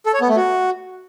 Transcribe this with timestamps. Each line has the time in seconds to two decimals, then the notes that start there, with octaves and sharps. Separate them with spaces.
0.06 A4
0.14 C#5
0.21 B3
0.29 A3
0.36 F#4